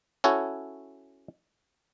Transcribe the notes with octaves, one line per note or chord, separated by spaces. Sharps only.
C#4 E4 F#4 A4 C#5